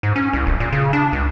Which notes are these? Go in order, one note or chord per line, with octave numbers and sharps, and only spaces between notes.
G#2
C#4
C2
D1
A#2
C#3
D4
C#2